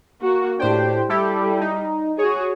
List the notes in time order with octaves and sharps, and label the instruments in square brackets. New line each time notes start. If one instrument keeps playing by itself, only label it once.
[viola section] A#3 F#4
[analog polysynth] A2 C5 G5 [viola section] D4 G4
[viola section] G3 [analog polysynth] E4 G4 A4
[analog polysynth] D#4
[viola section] F#4 G#4 [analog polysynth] C#5